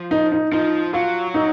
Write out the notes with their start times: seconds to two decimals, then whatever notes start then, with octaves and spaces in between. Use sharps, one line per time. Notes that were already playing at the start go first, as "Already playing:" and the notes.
Already playing: F3
0.11 D#4
0.32 D#4
0.52 F3 D#4
0.93 F#3 F4
1.34 D#4